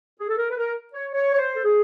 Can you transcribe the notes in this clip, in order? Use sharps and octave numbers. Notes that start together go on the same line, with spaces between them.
G#4
A4
A#4
B4
A#4
C#5
C#5
C#5
C5
A4
G#4